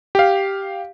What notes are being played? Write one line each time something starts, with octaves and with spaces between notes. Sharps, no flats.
G4 F5